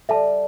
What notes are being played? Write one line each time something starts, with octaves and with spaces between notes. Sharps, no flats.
G3 A4 E5 A5